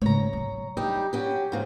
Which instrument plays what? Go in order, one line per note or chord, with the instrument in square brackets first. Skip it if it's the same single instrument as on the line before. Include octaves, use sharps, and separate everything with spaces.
[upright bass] G#2 C#3 [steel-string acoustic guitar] C#5 A#5
[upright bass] B1 F#3
[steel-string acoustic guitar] G3 D#4 G4 [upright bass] D4
[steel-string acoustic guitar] F#3 C#4 G4
G#2 C#3 F3